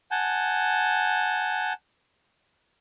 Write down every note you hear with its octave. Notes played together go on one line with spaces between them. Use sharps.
F#5 G#5 A5 G6